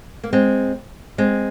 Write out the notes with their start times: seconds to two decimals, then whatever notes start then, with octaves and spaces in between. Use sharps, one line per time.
0.24 A#3
0.33 G#3 C4
1.18 G#3 C4